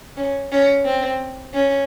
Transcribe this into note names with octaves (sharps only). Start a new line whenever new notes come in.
C#4
C#4
C4
C#4